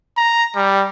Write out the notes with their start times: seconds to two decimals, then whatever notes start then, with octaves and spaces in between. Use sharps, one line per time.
0.17 A#5
0.56 G3